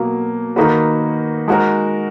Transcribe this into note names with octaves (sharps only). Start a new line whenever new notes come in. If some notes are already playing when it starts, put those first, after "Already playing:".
Already playing: B2 F#3 A#3
D#3 A#3 D#4 F#4 B4
G#3 D#4 F#4 A#4